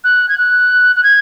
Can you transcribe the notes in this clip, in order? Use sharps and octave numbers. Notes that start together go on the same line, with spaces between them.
F#6
G#6
F#6
F#6
G#6